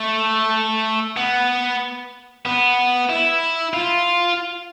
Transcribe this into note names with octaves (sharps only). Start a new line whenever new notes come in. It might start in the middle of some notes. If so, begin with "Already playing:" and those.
Already playing: A3
B3
B3
E4
F4